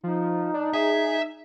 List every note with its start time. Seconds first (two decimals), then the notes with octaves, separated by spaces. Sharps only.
0.04 F3 D#4
0.54 D4
0.73 G#4 E5